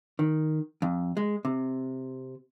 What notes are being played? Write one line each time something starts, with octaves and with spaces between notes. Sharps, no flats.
D#3
F2
G#3
C3